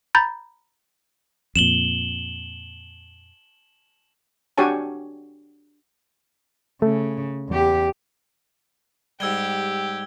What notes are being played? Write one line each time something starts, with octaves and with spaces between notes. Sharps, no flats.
A#5 B5 G6 A6
F2 A#2 E7 F#7 G7
D4 F#4 G4 C#5 G#5 A5
C#3 A3
E2 G4
G#2 G3 G4 E6 G#6 G7